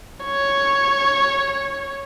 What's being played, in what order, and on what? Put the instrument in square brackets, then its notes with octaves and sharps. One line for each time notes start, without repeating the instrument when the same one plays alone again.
[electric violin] C#5